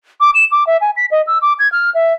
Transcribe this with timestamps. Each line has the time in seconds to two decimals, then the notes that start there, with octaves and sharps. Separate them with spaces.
0.21 D6
0.34 E7
0.52 D6
0.67 E5
0.81 G#5
0.97 B6
1.11 D#5
1.27 E6
1.42 D6
1.59 G#6
1.72 F6
1.95 E5